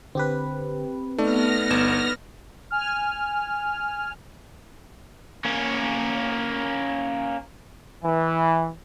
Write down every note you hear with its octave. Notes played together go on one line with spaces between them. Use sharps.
D3 C4 G4 B4
A3 B3 D#4 A4 D5 F6 A#6
G1 E7
G#5 F6
A#3 C#4
E3